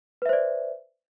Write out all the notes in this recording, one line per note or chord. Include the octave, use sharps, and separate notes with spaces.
B4 C5 D5 E5